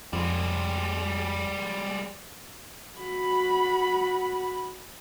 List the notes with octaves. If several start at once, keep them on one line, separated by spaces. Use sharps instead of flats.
F2 G3 G#3
F#4 B5